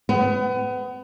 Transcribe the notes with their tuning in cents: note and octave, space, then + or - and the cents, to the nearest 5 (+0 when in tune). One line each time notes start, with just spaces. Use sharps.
B3 +30